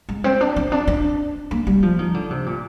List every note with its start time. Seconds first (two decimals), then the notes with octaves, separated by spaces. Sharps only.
0.09 G#3
0.24 C4
0.41 D4
0.56 C4
0.72 D4
0.88 D4
1.51 A#3
1.67 G3
1.82 F3
1.99 D#3
2.14 D3
2.31 C3
2.46 A#2